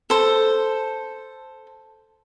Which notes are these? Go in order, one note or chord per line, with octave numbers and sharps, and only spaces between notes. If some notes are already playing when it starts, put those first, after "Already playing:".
A4 C5